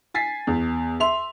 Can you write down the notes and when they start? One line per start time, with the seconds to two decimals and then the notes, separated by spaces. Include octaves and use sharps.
0.14 G#5 A6 B6 C7
0.47 E2
1.00 E5 C6 F7